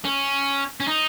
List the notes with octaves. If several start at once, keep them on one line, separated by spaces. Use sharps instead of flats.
C#4
C#4
D#4